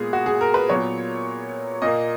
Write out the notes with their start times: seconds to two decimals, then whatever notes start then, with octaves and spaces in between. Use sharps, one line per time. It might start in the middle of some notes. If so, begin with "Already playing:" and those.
Already playing: A#2 G#3 B3 G#4
0.13 F#4
0.26 G#4
0.41 A#4
0.54 B4
0.69 A#2 F#3 B3 C#5
1.82 A#2 A#3 D#5